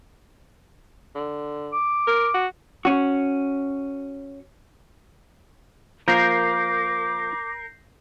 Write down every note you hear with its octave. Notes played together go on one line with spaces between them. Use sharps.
D3
D6
A#4
F#4
C#4 F#4
F3 A#3 A#4 D6 G6 A#6 C7